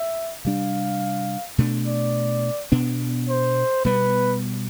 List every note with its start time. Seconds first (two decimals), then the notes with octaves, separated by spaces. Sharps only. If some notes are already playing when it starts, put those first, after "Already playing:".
Already playing: E5
0.45 C3 G3 D4 F5
1.58 B2 A3 D4
1.87 D5
2.72 B2 B3 D4
3.29 C5
3.85 B2 G3 B3 B4